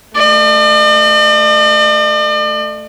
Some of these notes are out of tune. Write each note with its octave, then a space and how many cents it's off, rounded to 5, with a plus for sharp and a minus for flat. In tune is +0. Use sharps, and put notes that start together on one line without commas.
A3 +0 D5 +45